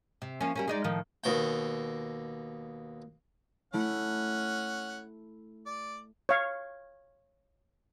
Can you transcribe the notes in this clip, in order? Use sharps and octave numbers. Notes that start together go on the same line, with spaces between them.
C3
F3 A#3 C#4
G3 A#3 C#4
G#3 D#4 D5
A2 D#3 F3
D#2 B2 G5
A3 C#4 E4 F#5
D5
C#5 F5